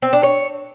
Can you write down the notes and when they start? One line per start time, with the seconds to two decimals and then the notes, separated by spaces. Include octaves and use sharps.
0.02 C4
0.13 D4
0.23 C#5